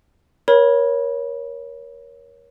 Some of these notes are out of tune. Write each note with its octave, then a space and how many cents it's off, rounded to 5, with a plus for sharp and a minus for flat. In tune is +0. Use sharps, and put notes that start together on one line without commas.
A#4 +30 C#5 +0 B5 -25